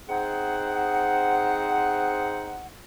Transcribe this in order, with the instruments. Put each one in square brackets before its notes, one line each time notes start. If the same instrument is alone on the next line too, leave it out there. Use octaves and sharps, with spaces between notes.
[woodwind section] C4 D#4 G#4 C5 F#5